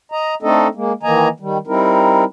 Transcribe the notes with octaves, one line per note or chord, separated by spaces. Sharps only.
D#5 A#5
A3 C4 D4 D#4 A4 D#5
G#3 A#3
D#3 E3 A#3 D#5 G#5 A#5
D#3 G3
G3 C4 D#4 E4 A#4